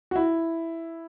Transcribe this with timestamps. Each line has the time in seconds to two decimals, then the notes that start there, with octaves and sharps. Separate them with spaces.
0.11 F#4
0.16 E4